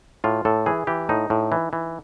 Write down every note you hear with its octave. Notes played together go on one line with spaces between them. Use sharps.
A2 F4
A2 A4
E3 G#4
E3 G4
A2 D#4
A2
E3
E3